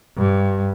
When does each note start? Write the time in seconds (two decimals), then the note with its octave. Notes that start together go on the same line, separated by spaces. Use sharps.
0.17 G2